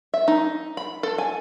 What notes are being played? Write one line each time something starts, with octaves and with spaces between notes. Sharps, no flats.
E5
D#4
B5
A4
G#5